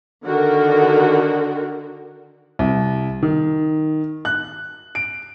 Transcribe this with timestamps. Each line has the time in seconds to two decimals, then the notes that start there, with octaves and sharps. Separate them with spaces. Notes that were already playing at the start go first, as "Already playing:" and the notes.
0.25 D3 D#3 F#4 A#4
2.59 C2
3.23 D#3
4.25 F#6
4.95 D7